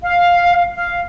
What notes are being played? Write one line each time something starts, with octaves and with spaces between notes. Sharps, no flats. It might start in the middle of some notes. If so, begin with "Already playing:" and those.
F5
F5